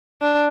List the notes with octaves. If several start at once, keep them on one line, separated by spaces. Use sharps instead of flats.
D4